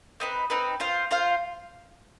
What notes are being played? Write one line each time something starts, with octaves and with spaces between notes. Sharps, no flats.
C4 D#4 B4
C4 D#4 B4
F4 C5 F5
F4 C5 F5